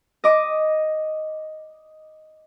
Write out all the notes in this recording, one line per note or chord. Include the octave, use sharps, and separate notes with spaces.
D#5 D6